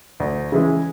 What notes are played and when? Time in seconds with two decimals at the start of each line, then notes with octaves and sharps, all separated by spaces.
0.20 D2
0.52 C#3 E3 G#3